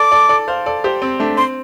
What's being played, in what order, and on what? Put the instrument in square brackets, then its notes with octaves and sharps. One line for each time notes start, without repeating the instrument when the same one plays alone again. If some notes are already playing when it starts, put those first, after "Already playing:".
Already playing: [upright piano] A4 D5 [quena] D6
[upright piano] A4 D5
A4 D5
C5 F5
A4 D5
G4 C5
C4
A3 D4
[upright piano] C4 [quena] C6